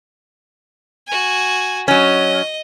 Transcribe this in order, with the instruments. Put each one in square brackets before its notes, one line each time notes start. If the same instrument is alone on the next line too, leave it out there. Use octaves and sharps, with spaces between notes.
[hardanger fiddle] F#4 G#5
[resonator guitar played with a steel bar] F#3 C#4 [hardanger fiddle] D#5